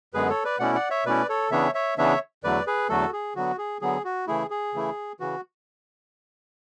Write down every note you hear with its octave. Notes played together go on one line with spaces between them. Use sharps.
F#2 D3 G#3 B3 G#4 B4
A4 C#5
B4 D5
B2 A3 C#4 E4 D5 F#5
D5 F#5
C#5 E5
B2 A3 C#4 E4 B4 D5
A4 C#5
C#3 E3 B3 D4 C#5 E5
C#5 E5
C#3 E3 B3 D4 C#5 E5
E2 D3 F#3 A3 B4 D5
G#4 B4
E2 D3 F#3 A3 F#4 A4
G#4
D3 F#3 B3 F#4
G#4
D3 F#3 B3 G#4
F#4
C#3 E3 A3 E4 G#4
G#4
C#3 E3 A3 E4
C#3 E3 F#4